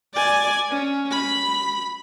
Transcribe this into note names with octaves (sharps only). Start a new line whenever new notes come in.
D5 G#5
C#4
B5